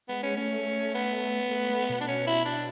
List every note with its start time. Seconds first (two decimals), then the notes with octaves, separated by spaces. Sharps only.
0.09 G#3 B3
0.23 C#4
0.37 A3 C#4
0.95 B3
1.51 A3
1.69 A3
1.89 B2
2.01 D4
2.08 C#4
2.27 E4
2.45 D4